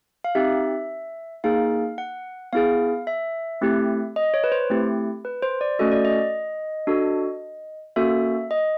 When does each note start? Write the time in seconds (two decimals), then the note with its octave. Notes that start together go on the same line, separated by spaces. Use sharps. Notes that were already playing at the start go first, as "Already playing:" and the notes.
0.24 F5
0.35 C4 D#4 G4 E5
1.44 A#3 D#4 G#4 F5
1.98 F#5
2.53 B3 E4 G#4 F5
3.07 E5
3.61 A3 C4 E4 G4
4.16 D#5
4.34 C#5
4.44 B4
4.52 C5
4.70 A3 C4 E4 G4
5.25 B4
5.43 C5
5.61 D5
5.79 A3 C#4 F#4 A4 D#5
5.92 D5
6.05 D#5
6.87 D4 F#4 A4
7.96 A#3 C#4 F#4 A4 E5
8.51 D#5